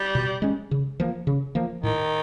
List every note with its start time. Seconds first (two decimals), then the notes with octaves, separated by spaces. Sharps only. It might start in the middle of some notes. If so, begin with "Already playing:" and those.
Already playing: G3
0.15 B2
0.42 G#3 C#4
0.71 C#3
1.00 F3 A#3
1.27 C#3
1.55 F3 A#3
1.83 A2 D#3